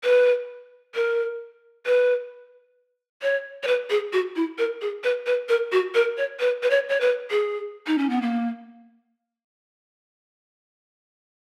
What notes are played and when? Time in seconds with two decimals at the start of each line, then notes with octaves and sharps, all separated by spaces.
0.04 B4
0.95 A#4
1.86 B4
3.22 C#5
3.63 C#5
3.67 B4
3.90 G#4
4.13 F#4
4.36 E4
4.58 A#4
4.81 G#4
5.04 B4
5.26 B4
5.49 A#4
5.72 F#4
5.95 A#4
6.17 C#5
6.40 B4
6.63 B4
6.70 C#5
6.89 C#5
7.00 B4
7.31 G#4
7.87 D#4
7.98 C#4
8.10 B3
8.22 A#3